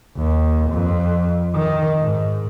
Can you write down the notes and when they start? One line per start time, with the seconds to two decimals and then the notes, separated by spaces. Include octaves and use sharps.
0.17 D#2
0.70 F2
1.55 D#3
2.01 G#2